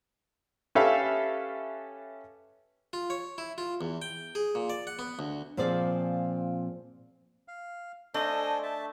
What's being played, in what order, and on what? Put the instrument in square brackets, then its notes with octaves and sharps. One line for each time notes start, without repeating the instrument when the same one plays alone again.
[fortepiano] C#4 G4 A4 B4 E5 F5
[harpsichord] F4
C#5
E4
F4
E2
G5
G#4
A#2
D5
F#5
B3
D2
[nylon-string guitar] A#2 F3 C4 G#4 D5
[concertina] F5
[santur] A3 [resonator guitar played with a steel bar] D4 [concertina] A4 C5 G#5 [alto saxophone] D#5
[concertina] E5 A5